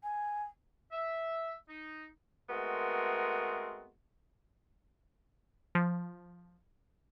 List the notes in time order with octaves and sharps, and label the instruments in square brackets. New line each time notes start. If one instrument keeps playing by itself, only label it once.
[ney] G#5
[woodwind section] E5
D#4
[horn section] G#3 A3 B3 C4 F#4 A#4
[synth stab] F3